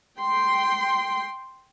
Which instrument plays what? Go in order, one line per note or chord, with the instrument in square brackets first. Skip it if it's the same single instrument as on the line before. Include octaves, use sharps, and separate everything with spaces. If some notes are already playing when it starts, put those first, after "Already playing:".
[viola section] G5 C6